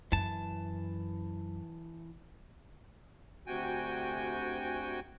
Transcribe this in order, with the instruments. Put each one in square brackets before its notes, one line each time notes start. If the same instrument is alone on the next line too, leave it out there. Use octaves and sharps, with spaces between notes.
[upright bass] F#2 [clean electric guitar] E3 A5
[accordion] D2 C3 F#4 G5 G#5